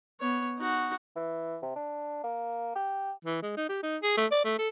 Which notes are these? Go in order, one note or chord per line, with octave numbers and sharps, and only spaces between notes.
B3 C#5
D#4 F#4
E3
C3
D4
A#3
G4
E3
G#3
D#4
G4
D#4
G#4
A3
D5
A3
A4